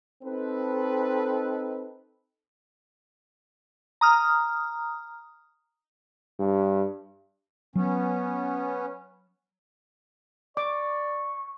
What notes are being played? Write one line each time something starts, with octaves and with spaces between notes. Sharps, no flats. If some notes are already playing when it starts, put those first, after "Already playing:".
C4 D#4 A4 B4
A#5 D#6 F6
G2
F#3 B3 C#4
D5 C#6 D6